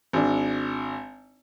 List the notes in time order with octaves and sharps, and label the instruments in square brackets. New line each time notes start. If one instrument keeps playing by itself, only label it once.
[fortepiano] G#1 D4